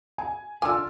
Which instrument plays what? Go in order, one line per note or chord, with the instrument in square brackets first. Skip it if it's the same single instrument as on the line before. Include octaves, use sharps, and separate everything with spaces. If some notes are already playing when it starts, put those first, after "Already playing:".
[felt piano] G#5
[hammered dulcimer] D3 F4 [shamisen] G#5 [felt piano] D6 E6